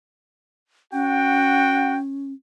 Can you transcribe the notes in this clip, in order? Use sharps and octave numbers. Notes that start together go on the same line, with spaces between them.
C#4 F#4 F#5 G5